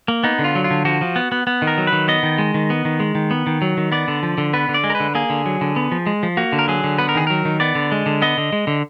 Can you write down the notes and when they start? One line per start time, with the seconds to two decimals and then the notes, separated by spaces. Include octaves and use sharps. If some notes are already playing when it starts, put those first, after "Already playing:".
0.08 A#3
0.24 B3 D#4
0.39 D3
0.44 F4
0.55 F#3
0.64 F4
0.71 D3
0.85 F3 F#4
1.01 F3
1.16 B3
1.32 B3
1.47 B3
1.62 D#3
1.67 A#4
1.78 F#3
1.87 B4
1.93 D#3
2.08 B3 D#5
2.23 D#3
2.38 G#3
2.54 D#3
2.70 B3
2.85 D#3
3.00 G#3
3.15 D#3
3.31 B3
3.47 D#3
3.62 F#3
3.77 D#3
3.92 B3 D5
4.08 D3
4.23 F3
4.38 D3
4.53 B3 B4
4.69 D3
4.74 D5
4.84 G#3
4.90 A#4
4.95 B4
5.00 D3
5.15 A#3 G#4
5.30 D3
5.46 F#3
5.61 D3
5.76 B3
5.91 F3
6.06 G#3
6.23 F3
6.37 A#3 F#4
6.52 D3
6.59 A#4
6.68 F#3 G#4
6.84 D3
6.98 B3 B4
7.09 A#4
7.15 D#3 G#4
7.27 F#3 A#4
7.45 D#3
7.60 B3 D5
7.75 D3
7.92 G#3
8.06 D3
8.22 B3 D#5
8.37 D3
8.52 G#3
8.67 D3